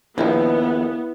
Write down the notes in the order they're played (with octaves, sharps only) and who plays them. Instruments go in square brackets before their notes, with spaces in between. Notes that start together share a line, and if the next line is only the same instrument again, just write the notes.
[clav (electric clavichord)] A#1 D#2 [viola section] B3 [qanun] E4